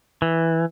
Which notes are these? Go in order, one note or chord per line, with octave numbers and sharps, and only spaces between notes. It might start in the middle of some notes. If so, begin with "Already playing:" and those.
E3